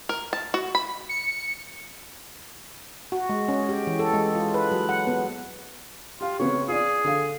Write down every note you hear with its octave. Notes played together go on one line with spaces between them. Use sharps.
A#4
A5
F#4
B5
C#7
F#4
G#3
C#4
G4
E3
A4
G#3
F4
B4
F#3
F#5
B3
F4 G4 F5
C#3 B3 C4 C#5
F4 G#4 D5
D3 F5